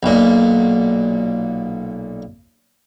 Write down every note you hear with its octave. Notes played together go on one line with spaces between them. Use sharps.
B1 A#2